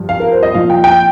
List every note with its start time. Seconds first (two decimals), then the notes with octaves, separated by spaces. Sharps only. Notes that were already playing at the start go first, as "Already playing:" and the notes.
Already playing: G2 F3
0.09 F5
0.20 A#4
0.32 C5
0.43 D#5
0.54 A#2 F3 F5
0.70 G5
0.84 G5